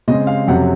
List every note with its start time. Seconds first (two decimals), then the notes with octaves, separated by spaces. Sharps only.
0.08 C#3 G#3 C4 D#5
0.27 F5
0.47 F2 C3 F#3 C#4 F#5